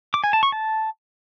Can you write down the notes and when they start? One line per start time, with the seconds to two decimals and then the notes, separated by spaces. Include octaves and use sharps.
0.14 D6
0.24 G#5
0.33 A5
0.43 C#6
0.52 A5